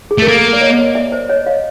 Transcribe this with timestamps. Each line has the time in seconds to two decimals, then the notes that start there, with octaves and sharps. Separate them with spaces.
0.11 G#4
0.18 A3
0.22 A#4
0.27 A#3 A4
0.53 D5
0.61 C#5 D#5
0.95 D5 E5
1.12 C5 D5
1.29 C#5 D#5
1.46 D#5 F5